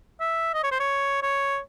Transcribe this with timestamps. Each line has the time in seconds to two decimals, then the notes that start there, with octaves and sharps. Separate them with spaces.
0.20 E5
0.54 D#5
0.63 C#5
0.71 C5
0.79 C#5
1.22 C#5